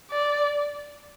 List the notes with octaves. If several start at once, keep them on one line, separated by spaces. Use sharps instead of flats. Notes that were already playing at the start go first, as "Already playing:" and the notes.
D5